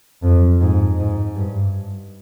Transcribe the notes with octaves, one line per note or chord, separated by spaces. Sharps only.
F2
G#2
G#2
G2